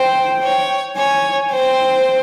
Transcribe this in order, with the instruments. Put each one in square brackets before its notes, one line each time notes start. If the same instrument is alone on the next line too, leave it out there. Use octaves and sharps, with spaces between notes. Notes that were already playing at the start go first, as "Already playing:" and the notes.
Already playing: [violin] C5 [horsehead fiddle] G5
[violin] C#5
[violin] C#5 [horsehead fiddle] G#5
[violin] C5 [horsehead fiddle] G5